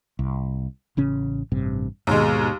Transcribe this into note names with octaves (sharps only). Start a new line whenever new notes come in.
C2
A1 C#3 C#4
A1 G2 C3
D#2 G#2 B2 G#3